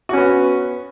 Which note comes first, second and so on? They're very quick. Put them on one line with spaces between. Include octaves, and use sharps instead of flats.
F#4 C#4 B3